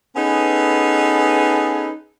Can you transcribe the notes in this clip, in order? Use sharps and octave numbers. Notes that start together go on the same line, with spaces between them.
B3 C#4 D#4 G#4 A4 B4